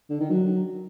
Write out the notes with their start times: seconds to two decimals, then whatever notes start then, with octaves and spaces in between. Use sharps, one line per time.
0.10 D3
0.20 D#3
0.30 F#3